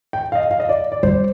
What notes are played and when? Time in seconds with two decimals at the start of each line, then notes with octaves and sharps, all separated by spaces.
0.13 G5
0.32 F5
0.35 D#5
0.51 F5
0.60 D#5
0.69 D5
0.92 D5
1.03 G3 C5